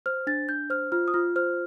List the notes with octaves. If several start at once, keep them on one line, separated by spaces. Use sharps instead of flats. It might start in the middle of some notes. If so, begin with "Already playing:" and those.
C5 F6
D4 A6
D4 G6
C5 F6
F4 F6
D#6
F4 F6
C5 F6